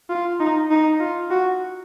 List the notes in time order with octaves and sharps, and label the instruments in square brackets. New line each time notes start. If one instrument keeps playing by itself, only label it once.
[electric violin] F4
D#4
D#4
F4
F#4